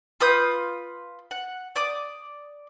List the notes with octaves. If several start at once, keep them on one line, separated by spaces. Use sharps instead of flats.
F4 B4 D#6 G6
F#5
D5 D6 D#6